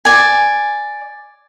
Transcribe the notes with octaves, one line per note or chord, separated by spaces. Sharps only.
D5 G#5